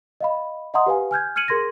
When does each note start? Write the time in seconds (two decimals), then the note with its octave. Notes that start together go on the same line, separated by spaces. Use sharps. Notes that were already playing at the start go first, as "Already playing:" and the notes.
0.21 D#5 F5 B5
0.74 D#5 E5 F#5 A#5 C6 D#6
0.86 G4 B4 F5 G#5
1.11 G#5 F6 G6 G#6
1.36 F6 G#6 C#7 D#7 F#7
1.48 G#4 A#4 C6 G#6 A#6